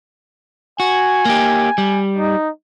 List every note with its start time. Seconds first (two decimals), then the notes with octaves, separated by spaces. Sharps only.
0.80 F#4 G#5
1.25 A#3 G4
1.78 G3
2.18 D#4